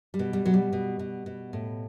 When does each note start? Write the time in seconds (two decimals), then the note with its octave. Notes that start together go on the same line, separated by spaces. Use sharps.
0.14 G3
0.19 B2
0.33 G3
0.45 B2 F#3
0.54 G3
0.73 B2
0.99 B2
1.26 B2
1.53 A2